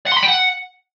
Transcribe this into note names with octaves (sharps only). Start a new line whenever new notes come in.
F#5
C6
B5
G5
F#5